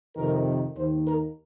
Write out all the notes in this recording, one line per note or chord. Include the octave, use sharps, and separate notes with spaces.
F2 C3 D#3 A#4
D#2 D#3 C5
A#4